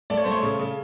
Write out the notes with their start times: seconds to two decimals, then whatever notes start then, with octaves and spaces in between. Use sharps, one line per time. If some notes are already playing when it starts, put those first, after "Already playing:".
0.10 A3 D5
0.17 C#5
0.24 A3 C5
0.32 C#5
0.43 C#3
0.59 C#3